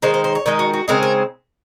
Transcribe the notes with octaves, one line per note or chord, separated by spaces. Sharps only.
D#3 G#3 D#4 C5
C5
C5
C#5
D#3 G#3 D#4 D#5
F#4
F#4
C#3 G#3 C4 D#4 A#4
A#4